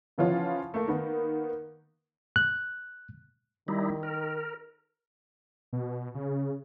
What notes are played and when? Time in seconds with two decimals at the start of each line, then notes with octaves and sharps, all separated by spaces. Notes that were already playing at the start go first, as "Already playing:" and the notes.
0.18 C#3 E3 F3 B3 C#4 F4
0.74 A3 A#3
0.88 D#3 A#3 B3
2.36 F#6
3.68 D#3 G3 D#4 E4
4.03 A#4
5.73 B2
6.15 C#3